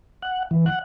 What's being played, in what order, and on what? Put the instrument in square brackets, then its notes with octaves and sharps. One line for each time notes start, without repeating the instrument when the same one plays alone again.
[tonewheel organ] F#5
E3
F#5